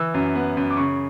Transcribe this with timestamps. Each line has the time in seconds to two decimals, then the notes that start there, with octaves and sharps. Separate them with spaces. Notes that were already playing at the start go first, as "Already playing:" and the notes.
Already playing: E3 E6
0.14 F#2
0.35 B3
0.57 F#2
0.71 D6
0.77 C#3 C#6